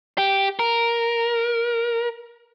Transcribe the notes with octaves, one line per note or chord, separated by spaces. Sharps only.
G4
A#4